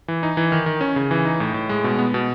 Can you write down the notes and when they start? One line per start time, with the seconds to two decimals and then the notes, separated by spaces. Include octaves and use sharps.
0.08 E3
0.23 D#4
0.37 E3
0.52 D#3
0.66 D#3
0.81 C#4
0.96 C#3
1.11 E3
1.25 D#4
1.40 A2
1.54 A2
1.69 G#3
1.84 B2
1.99 B3
2.14 B2